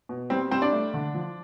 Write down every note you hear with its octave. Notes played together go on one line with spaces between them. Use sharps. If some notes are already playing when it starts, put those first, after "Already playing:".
B2
G3 C4
G3 C4 C5
D4 D5
A3
D3
F3